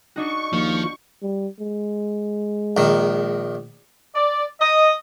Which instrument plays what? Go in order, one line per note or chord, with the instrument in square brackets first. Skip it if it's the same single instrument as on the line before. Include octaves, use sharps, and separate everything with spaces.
[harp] D4 D#4 F#4 [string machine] C#6
[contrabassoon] D#2 [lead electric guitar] F3
[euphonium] G3
G#3
[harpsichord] A#1 D#3
[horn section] D5
D#5